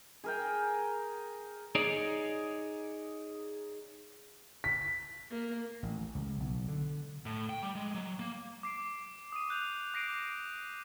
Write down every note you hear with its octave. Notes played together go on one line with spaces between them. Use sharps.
G#4 A#4 G5
D#4 G#4 C#5 D5
B6
A#3
A1
C#2
B1
D3
A2
G5
G3
G#3
F#3
A#3
D6 C7 D7
D#6 D#7
F#6 G6 F7
D6 A#6 C7 D7 D#7